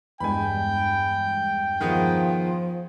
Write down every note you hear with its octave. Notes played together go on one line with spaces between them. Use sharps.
E2 G2 G#3 G5 G#5 B5
D#3 F3 B3 G#4